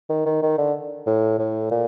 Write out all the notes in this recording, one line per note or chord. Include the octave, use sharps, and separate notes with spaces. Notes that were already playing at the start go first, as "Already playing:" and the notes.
D#3
D#3
D#3
D3
A2
A2
A#2